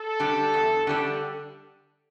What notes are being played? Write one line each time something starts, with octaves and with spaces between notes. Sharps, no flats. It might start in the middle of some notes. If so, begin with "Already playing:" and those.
Already playing: A4
D3 G3 D4
E2
D3 G3 D4